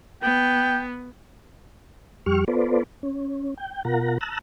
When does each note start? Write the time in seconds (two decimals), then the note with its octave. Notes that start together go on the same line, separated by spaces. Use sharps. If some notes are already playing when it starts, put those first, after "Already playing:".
0.22 B3 G5
2.26 F2 G3 G4 C#6 F6
2.48 B3 F4 A4 B4 C5 D5
3.03 C#4
3.57 G5
3.85 B2 F4 A#4 F#5 A#5
4.21 A5 A#5 E6 F#6